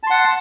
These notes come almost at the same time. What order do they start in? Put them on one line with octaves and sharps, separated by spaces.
A5 C6 F#5